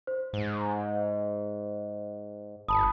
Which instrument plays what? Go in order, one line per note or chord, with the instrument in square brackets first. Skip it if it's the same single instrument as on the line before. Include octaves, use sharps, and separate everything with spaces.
[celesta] C5
[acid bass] G#2
[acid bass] G1 [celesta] A5 B5 D#6